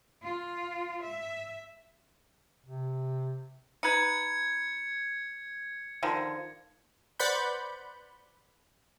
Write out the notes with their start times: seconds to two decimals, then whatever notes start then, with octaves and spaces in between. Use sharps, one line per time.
0.23 F4
1.02 E5
2.66 C3
3.83 D#4 B4 G#6 C#7
6.03 D3 D#3 F3
7.19 B4 C5 D5 F#5 B5 G6